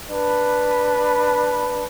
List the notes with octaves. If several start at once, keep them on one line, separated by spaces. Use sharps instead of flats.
D4 B4